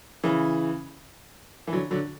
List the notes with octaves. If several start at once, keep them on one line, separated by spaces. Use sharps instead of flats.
C#3 E3
E3
D3 F#3
D3 F#3